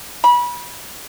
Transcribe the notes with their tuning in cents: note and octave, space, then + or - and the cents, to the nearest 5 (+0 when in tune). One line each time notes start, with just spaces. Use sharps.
B5 -25